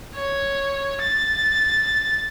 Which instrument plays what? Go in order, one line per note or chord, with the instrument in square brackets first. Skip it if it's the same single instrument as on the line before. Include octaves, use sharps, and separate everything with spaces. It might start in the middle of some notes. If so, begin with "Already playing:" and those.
[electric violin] C#5
A6